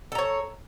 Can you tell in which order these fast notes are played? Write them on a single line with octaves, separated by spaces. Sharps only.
A4 A#5 C#5